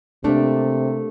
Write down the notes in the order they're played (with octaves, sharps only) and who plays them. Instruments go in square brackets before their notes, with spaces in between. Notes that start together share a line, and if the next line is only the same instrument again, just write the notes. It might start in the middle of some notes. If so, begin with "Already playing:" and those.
[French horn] C3 [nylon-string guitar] A3 A#3 D4